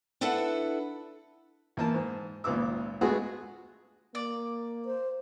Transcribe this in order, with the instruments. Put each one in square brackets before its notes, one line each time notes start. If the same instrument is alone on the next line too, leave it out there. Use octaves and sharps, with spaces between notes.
[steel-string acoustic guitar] D4 E4 A4 B4 F#5
[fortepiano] E2 A#3 A5
G#2
G#1 C#2 A#2 B3 D6 E6
G#3 A3 B3 F#4 G#4
[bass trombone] A#3 [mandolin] D5
[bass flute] C5